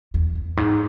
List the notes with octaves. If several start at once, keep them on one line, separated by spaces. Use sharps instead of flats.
E2
E2
G#2